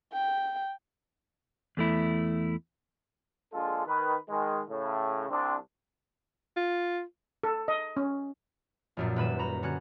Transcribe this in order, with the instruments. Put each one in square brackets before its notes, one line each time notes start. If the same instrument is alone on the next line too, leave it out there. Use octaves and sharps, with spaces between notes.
[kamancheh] G5
[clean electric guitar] E2 A3 E4
[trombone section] A#1 G#3 D4 F4 A4
D#3 B4
D#3 G#3
A2 C#3
C2 C4 D4
[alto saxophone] F4
[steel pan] A4
D#5
C#4
[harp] A#1 F#2 A#2
D#1 B4 B5 E7
F#4 A#5 B5
D3 C#4 F#4 F#6